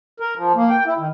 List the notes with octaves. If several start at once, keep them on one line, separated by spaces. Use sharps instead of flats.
A#4
F3
A#3
G5
E4
D#3